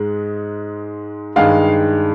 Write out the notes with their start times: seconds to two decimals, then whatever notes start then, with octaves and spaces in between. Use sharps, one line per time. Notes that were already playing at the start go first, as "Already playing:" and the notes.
Already playing: G#2 G#3
1.36 G2 D#3 G#3 F5